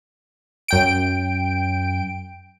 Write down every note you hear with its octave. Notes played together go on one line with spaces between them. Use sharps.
F#2 G5 D7